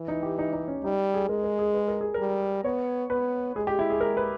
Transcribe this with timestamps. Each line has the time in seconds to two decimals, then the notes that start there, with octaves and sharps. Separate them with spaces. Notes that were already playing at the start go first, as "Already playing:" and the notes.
Already playing: E3
0.08 D#4
0.23 G4
0.39 D#4
0.53 D#4
0.68 C#4
0.84 G3 D#4
1.14 G#4
1.29 G#3 A#4
1.44 A#4
1.59 G#4
1.74 B4
1.88 A#4
2.01 G#4
2.14 A#4
2.19 G3
2.64 B3 C#5
3.10 B3 B4
3.55 G#3 G#4
3.67 G4
3.79 E4
3.90 G#4
4.01 A#4
4.17 B4